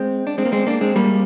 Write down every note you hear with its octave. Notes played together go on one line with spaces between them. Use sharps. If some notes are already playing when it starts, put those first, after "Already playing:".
Already playing: G#3 C4
D4
G#3 C4
A#3
G#3 C4
A#3 D4
G#3 C4
G3 A#3